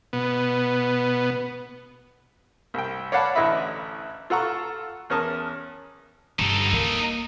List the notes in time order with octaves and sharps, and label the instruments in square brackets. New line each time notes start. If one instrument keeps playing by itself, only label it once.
[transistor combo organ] B2 B3
[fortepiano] C2 G5
C#5 D5 F5 F#5 A5 B5
A1 D2 E4 D#5 E5 B5
F4 A4 F#5 A#5 C#6
E2 C#4 A#4 A5 D#6
[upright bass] G1 [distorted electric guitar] D#4 A4
[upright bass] A#3